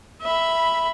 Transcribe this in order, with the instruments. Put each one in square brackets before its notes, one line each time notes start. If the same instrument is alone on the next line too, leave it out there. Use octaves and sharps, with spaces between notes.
[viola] E5 B5